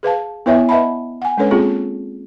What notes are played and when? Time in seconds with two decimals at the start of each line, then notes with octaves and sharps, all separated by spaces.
0.03 G#4 B4 F5 A5
0.46 B3 E4 B4 C#5 E5 G#5
0.69 B4 D#5 E5 F#5 A5 B5
1.22 F#5 G#5
1.38 G#3 C#4 D4 A4 B4 C#5
1.51 G#3 A#3 C4 F4 G#4